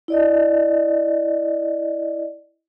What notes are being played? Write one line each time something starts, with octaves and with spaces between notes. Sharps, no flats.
E4 D5 D#5